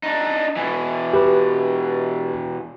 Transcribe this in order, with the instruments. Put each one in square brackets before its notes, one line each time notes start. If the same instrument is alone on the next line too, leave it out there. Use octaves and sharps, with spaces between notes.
[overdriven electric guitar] D4 D#4
B2 E3
[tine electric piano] G4 B4